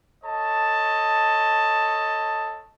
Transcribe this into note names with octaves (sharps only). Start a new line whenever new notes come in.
A4 C#5 D#5 A5